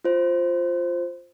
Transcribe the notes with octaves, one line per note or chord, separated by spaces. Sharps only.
F4 C5